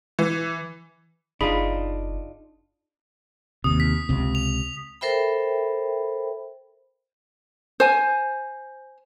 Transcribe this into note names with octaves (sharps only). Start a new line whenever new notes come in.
E3
F#1 D4 D#4 F4 G#4 B5 B6
D#2 C3 D#6
B6
C#2 C3
F7
A4 A#4 C5 E5 G5 B5
C5 G#5